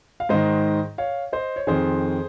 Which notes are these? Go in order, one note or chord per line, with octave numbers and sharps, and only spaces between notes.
F5
G#2 D#3 C5 D#5
C#5 F5
C5 D#5
C#5
F2 D#3 G#4 C5